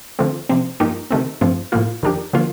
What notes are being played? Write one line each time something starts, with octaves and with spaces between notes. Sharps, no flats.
D3 F3 A3 C4
C3 F3 C4
G2 F3 A#3 D#4 G4
C3 D#3 A3 C4
G2 F3 A3 C4
A2 F3 A#3 F4
F2 D#3 A#3 D4 G4
D3 F3 A#3 F4